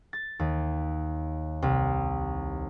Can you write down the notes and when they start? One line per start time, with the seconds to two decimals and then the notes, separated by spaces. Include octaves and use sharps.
0.13 A6
0.39 D#2
1.62 C2